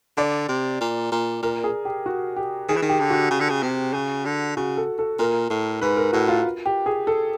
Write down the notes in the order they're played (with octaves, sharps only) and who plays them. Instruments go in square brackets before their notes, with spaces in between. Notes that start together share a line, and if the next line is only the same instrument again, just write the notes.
[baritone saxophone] D3 [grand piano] D5
[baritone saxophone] C3
A#2
A#2
[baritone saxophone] A#2 [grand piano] A#4
[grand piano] G#4
G4
F#4
G4
[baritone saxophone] D#3 [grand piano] G#4
[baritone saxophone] E3
D#3
[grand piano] G4
[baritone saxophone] D3
[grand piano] F#4
[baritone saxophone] C#3
D3
C#3
C3
C#3
D3
[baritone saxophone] C#3 [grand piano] F#4
[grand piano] A4
A4
[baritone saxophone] A#2 [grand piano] A#4
[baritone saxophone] A2
[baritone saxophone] G#2 [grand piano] B4
[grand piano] A#4
[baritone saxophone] A2 [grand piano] F#4
[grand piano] F4
G4
G#4
A4